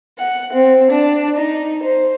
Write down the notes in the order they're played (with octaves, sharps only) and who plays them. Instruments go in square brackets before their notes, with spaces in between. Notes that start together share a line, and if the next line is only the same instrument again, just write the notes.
[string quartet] F#5
C4
D4
D#4
C5